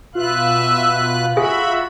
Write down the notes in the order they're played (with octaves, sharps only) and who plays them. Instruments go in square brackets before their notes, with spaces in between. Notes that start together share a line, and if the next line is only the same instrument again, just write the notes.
[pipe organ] B2 B4 F#6 [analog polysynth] F4 [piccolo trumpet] E5
[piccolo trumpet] F#4 [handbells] G#4 [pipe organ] E5 B5